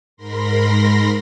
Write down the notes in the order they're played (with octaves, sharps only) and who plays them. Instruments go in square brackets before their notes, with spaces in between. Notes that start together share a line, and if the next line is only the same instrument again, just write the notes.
[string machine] G#2 A#4 B5 C6 A#6